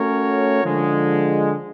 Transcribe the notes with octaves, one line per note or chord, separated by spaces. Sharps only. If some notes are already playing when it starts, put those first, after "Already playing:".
Already playing: A3 C#4 F#4 A#4 C#5
D3 F3 G#3